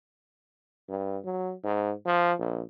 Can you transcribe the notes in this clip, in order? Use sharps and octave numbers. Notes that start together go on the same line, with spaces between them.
G2
F#3
G#2
F3
A#1